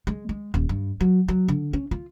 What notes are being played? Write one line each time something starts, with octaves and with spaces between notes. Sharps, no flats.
G#3
G#3
D#1
G2
F#3
F#3
D3
C#4
F4